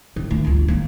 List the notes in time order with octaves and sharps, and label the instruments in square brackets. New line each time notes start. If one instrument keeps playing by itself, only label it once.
[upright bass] D#3
D2 D#3
G1 D2
D#3 A#3